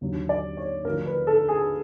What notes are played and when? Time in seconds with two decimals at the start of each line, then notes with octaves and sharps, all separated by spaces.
0.01 D#2 D3 F#3
0.29 D5
0.57 C#5
0.84 D2 D3 F3 A#4
1.06 B4
1.27 A4
1.49 G#4